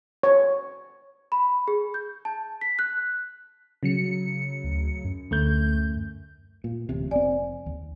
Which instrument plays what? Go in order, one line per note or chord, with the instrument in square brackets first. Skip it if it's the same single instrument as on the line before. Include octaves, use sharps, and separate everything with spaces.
[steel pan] C#5
[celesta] B5
G#4
G6
A5
B6
F#6
[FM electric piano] C#3 F#3 C#7
[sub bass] D2
F#2
[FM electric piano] D2 A3 G6
[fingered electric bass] A#2
D1 A1 C3
[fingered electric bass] F1 C4 [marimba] D5 G#5
[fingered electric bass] D#2